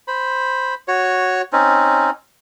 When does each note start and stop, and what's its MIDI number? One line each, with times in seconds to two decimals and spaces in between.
0.08 0.74 72
0.08 0.74 83
0.88 1.42 66
0.88 1.42 73
1.53 2.10 60
1.53 2.10 61
1.53 2.10 63